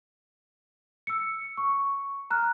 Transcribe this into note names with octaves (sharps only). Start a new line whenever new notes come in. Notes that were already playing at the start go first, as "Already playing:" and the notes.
E6 C#7
C#6
A#5 F6 F#6